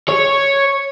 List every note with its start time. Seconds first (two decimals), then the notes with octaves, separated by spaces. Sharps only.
0.09 C#5